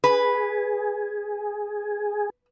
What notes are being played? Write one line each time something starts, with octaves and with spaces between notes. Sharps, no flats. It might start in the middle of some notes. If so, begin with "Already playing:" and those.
G#4 B4